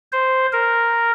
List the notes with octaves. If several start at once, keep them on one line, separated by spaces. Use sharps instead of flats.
C5
A#4